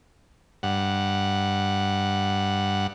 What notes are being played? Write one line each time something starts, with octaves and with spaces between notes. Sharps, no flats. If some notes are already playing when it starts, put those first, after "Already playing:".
G2 F#5